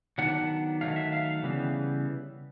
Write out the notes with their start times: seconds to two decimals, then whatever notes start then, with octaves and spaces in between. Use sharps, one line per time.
0.18 D#3 F#3 B3 D4 F#5
0.81 D#3 F#3 A3 F5
0.96 E5
1.12 F5
1.43 C#3 E3 G3 B3